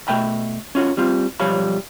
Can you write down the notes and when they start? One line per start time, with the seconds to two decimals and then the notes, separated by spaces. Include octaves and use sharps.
0.08 B2 A3 E5 G5 B5
0.75 C#4 F4 F#4
0.97 G3 C4 F4
1.40 B1 F3 G3 C#5 F5 B5